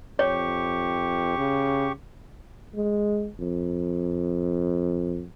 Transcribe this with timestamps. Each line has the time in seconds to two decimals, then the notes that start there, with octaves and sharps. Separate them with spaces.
0.19 F2 G4 C#5 C#6
1.38 C#3
2.75 G#3
3.40 F2